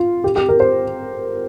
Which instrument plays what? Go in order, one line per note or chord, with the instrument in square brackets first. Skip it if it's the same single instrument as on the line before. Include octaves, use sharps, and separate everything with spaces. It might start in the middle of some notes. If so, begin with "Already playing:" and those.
Already playing: [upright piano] F4
G4
G4
A#4
C5